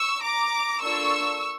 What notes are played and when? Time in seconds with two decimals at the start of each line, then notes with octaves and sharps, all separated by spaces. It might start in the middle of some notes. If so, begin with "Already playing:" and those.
Already playing: C#6 E6
0.23 A#5 D6
0.81 A#3 D4 F4 A4 C#6 E6